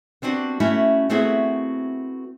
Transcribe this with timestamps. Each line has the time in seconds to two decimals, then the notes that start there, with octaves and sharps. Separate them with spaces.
0.22 B3 C4 D4 F#4 G4
0.60 A3 C#4 E4 F#4
1.10 A3 B3 C4 E4 F#4 G#4